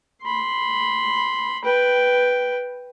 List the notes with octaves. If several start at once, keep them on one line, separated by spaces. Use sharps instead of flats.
B5 C6
B4 G5